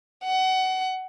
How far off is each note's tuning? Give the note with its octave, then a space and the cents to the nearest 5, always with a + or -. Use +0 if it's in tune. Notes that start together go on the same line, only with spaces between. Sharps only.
F#5 +25